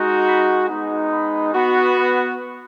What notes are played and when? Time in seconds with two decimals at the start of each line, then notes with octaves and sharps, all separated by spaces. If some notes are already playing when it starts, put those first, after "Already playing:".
Already playing: G#3 D#4 F#4
0.26 B5
0.69 G#3 B3 D#4
1.11 B5
1.53 B3 F#4